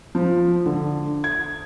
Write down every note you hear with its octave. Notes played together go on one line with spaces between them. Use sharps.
F3
D3
G#6